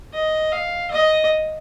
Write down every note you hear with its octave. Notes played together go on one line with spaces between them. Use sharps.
D#5
F5
D#5